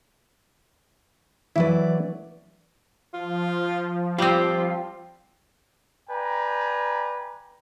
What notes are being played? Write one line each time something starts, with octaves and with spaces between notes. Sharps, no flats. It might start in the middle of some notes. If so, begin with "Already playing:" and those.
E3 F#3 E4 B4 D5
F3 F4
G3 C4 F4 G4
B4 D5 G5 G#5 A#5